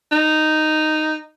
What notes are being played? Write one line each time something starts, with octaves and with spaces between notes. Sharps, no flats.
D#4